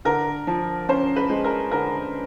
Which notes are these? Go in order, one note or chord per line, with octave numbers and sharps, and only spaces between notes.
D3 A#4
F3
C#4 C5
B4
G#3
A#4
D3 A#4